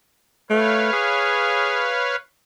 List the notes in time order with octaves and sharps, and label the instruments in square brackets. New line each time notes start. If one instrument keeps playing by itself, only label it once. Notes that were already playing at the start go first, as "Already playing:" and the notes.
[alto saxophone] A3 [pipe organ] B4 C#5 F5
[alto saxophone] G#4